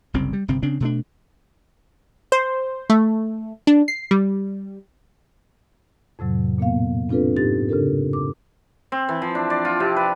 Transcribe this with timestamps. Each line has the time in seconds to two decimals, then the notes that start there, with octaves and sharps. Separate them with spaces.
0.14 F#1 C2 C#3 C4
0.33 G3
0.48 G1 C3 C4
0.62 C#3 C4 D4
0.80 B2 A3 D4
2.32 C5
2.90 A3
3.67 D4
3.88 C7
4.11 G3
6.19 F2 A2 C3 F#3
6.58 A#2 A#3 B3 F5
7.09 C4 D4 F4 A4 B4
7.36 G#2 D#4 G4 A6
7.69 C#3 D4 G4 A4 A#4
8.13 D6
8.92 C4
9.09 E3
9.22 F3
9.35 D4
9.50 D5
9.65 F4
9.80 C3
9.96 B4